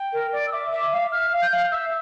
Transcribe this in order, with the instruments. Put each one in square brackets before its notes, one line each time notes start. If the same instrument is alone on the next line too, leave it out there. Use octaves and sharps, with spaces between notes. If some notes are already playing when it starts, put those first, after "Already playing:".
Already playing: [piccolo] G5
[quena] A#4
D5
[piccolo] E6
[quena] E5 [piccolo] D6
[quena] E5
F5
[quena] E5 [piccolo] F6
[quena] F5
[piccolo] G6
[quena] F5
[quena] E5 [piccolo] E6